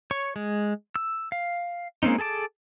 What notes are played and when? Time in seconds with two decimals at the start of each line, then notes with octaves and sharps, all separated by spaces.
0.11 C#5 C#6
0.36 G#3
0.96 E6
1.32 F5
2.03 G#3 A#3 C4 C#4 D#4
2.18 G#4 A4 A5 D6